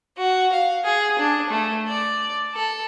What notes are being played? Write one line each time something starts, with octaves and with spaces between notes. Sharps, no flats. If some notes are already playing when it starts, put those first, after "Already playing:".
F#4
F5
G#4
D4
A3
D5
A4